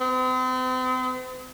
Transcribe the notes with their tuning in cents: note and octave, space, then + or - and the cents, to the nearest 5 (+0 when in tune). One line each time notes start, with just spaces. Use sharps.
C4 -40